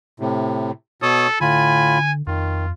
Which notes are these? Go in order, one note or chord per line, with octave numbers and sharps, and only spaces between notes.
A2 C3
B2 A4 C#5 D#6
A2 D3 F4 G#5 B5
F2 D#3 F4